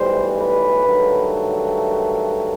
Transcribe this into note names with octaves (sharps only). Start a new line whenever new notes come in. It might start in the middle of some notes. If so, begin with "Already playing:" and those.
Already playing: B1 A2 E3 G3 C5
B4
G2 D#3 F#3 A3